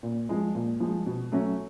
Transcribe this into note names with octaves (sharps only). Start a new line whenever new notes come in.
A#2
F3 G#3
A#2
F3 G#3
B2
F#3 A3 C#4 F#4